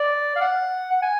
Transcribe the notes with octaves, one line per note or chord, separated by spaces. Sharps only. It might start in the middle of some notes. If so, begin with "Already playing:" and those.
Already playing: D5
F5
F#5
F#5
G#5